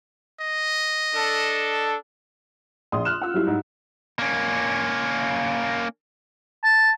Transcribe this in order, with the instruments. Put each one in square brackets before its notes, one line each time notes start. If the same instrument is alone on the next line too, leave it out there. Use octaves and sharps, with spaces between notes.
[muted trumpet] D#5
[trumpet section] D4 A4
[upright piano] A#1 [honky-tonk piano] C6 D#6
[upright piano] F6 F#6 E7
[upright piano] F4 [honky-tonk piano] F#5 E6
[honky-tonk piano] F#3 G3 E4
[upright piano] G#2
[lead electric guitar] A#3 C#4
[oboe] A5